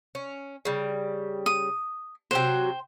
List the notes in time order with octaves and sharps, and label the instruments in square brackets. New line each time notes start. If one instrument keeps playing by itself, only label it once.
[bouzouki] C#4
C#3 G3
[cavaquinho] D#6
[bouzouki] C3 F#3 F#4 [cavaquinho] C5 G5